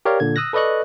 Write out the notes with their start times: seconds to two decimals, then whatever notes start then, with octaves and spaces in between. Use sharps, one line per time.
0.05 G4 A#4 C#5 D5 F5
0.20 A#2 D3 G#6
0.36 D#6 E6 F#6 A#6
0.53 A4 B4 D5 D#5 C#6 F#6